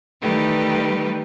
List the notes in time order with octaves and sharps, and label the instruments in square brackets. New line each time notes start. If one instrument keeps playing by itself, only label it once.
[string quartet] D#3 E3 G3 A3 G4 B4